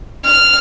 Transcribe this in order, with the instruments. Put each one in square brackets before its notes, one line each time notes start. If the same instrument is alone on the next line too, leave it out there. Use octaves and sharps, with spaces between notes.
[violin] F6